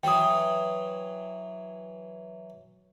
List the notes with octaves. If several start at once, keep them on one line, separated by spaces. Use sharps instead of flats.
E3 F#3 G5 D#6